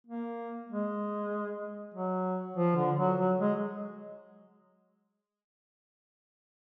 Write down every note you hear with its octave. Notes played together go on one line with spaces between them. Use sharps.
A#3
G#3
F#3
F3
D3
F#3
F#3
G#3